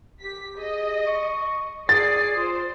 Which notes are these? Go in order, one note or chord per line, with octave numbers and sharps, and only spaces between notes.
G4 B6
G#4 D#5
C#6
G#4 D5 A6 C7
F4 C5